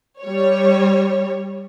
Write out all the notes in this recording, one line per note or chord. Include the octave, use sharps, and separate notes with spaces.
G3 C#5